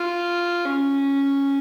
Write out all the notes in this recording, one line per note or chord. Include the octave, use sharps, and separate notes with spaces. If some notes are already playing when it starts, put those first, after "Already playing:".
Already playing: F4
C#4